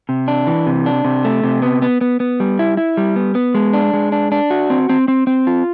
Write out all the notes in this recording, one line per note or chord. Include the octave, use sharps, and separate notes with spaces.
C3
D4
E3
C3
D4
C3
A3
C3
B3
B3
B3
B3
G3
E4
E4
G3
B3
B3
G#3
D4
G#3
D4
D4
F#4
C4
C4
C4
C4
F4